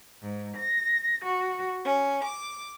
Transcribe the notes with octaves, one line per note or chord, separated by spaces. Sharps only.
G#2
A#6
F#4
C#4
D6